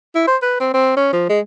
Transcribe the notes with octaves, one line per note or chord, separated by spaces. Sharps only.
E4
C5
B4
C4
C4
C#4
F3
G#3